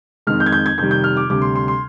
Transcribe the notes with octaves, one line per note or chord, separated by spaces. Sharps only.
F2 D#3 G#3 F6
G6
G#6
G6
G#6
F2 C3 D#3 G3 G6
G6
F6
D6
D2 C3 G3 D6
C6
C6
C6